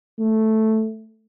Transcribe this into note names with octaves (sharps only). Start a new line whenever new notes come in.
A3